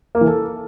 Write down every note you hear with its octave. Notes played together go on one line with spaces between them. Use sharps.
A#3
E3
A4